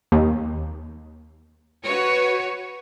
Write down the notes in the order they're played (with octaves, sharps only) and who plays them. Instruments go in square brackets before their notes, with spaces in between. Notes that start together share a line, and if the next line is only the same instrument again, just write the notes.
[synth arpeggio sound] D#2
[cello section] F#4 B4 C#5